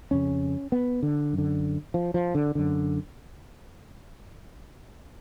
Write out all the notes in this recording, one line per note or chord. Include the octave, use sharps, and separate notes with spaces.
F2 C#3 C#4
B3
D3
F#2
D3
F3
F3
D3
F#2 D3